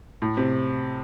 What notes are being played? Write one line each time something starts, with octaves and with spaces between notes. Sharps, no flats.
A2
C3